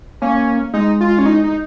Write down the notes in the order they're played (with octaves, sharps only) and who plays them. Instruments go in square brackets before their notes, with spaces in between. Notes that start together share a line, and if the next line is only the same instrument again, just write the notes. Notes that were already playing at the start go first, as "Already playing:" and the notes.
[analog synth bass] A#3 [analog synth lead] C#4
[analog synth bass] G#3 [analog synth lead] D#4
[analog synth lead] F4
C#4
D#4
D#4